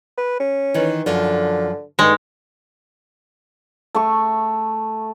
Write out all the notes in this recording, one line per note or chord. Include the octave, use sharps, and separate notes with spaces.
B4
C#4
D#3 E3
F#2 D3 F3
G2 D3 D#3 G#3
A3 C#6